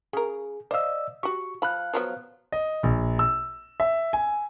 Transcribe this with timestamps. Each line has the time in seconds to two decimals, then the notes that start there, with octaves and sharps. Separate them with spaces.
0.13 C#3 G#4 A#4
0.71 C5 D5 D#5 F5 E6
1.23 F#4 G4 C#6
1.62 F3 F5 B5 F#6
1.94 F3 F#3 B3
2.52 D#5
2.83 A#1
3.19 E6
3.80 E5
4.13 G#5